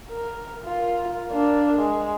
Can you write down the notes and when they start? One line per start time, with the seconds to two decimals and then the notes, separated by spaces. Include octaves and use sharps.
0.10 A#4
0.64 F4 A#4
1.31 A#3 D4
1.76 G#3